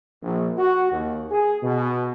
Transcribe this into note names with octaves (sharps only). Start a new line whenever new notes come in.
A#1
F#4
D#2
G#4
B2